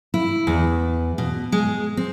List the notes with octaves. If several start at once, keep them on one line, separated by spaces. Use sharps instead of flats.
E4
E2
B2
G#3
C4